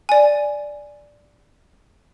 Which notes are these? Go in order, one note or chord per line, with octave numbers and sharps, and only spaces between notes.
D5 G#5